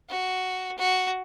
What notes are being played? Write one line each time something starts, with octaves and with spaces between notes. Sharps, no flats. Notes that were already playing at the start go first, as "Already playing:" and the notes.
F#4
F#4